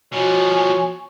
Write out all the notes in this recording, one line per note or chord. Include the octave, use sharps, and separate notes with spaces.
B2 F3 F#4 C#5 G#5